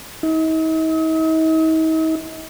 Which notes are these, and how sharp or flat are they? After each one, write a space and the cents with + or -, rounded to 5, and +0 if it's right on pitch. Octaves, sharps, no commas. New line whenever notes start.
D#4 +45